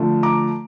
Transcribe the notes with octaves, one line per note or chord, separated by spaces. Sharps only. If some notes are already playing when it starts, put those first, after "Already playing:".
Already playing: D3 F3 A3
A#5 D6